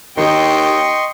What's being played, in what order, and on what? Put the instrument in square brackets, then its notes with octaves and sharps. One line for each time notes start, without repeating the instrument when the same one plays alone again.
[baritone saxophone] D#2 [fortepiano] D#3 [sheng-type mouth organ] D#5 C6 C#6 [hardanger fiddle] G5